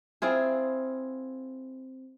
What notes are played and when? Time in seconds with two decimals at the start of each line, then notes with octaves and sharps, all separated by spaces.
0.22 C4 E4 F4 G#4